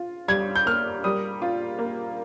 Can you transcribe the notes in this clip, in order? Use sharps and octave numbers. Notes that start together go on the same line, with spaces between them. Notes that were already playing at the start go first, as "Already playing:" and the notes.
Already playing: F4
G3 G#6
G6
A#3 F6
G3 D#6
F4
A#3